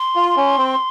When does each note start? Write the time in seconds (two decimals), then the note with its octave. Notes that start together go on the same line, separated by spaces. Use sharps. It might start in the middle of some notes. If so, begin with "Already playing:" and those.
Already playing: C6
0.16 F4
0.37 C#4
0.58 C4